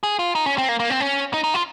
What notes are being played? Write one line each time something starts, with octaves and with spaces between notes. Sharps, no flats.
G#4
F4
D#4
C#4
C4
A#3
A#3
C4
C#4
D#4
D#4
F4